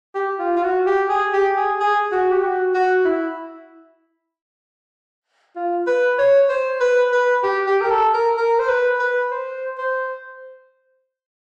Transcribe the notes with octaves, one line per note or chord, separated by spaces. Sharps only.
G4
F4
F4
F#4
G4
G#4
G4
G#4
G#4
F#4
G4
F#4
F#4
E4
F4
B4
C#5
C5
B4
B4
G4
G4
A#4
A4
A#4
A#4
C5
B4
B4
C5
C5